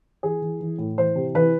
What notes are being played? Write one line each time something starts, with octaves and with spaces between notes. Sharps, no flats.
E3 G#4
E3
E3
A2
E3 C5
C3
E3 B4